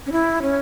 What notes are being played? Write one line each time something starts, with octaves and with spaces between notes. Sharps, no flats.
C#4
E4
C#4